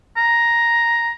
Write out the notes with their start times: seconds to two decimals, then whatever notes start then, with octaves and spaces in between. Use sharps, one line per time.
0.17 A#5